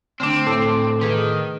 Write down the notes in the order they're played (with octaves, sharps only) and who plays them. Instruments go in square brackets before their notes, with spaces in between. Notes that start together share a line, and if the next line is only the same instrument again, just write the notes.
[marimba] D3 A3 D4 [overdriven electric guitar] C4
[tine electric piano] A2 A4 D6
[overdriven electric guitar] D#3 [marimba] G#4 B4